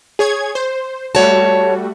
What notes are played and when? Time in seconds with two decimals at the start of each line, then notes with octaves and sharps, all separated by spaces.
0.19 G#4 C#5 G#6
0.55 C5
1.15 G3 A3 F#4 C#5 A5